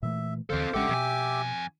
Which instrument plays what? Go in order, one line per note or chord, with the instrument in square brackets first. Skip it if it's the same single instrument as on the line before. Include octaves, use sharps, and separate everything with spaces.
[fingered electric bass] A#2 E3 A3 [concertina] E5
[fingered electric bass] D#2 D3 E3 [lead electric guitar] C4 A4 [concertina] C5 F5
[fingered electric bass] A1 G#3 C#4 [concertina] G4 E5 D6 [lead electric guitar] A4 F#5
[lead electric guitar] F2 G#5 [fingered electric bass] B2